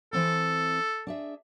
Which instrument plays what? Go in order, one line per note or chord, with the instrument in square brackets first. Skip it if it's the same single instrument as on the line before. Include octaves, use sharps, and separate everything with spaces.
[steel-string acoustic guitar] E3 C4 A5 [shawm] A4
[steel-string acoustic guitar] D4 G#4 E5